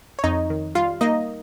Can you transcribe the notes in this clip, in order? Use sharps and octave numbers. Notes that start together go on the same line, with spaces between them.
C#5
F2 D#4 D#5
D#3
G3 F4 F5
A#3 D#4 D#5